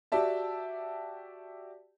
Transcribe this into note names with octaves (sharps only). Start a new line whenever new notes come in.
F#4 G4 D5 E5 A5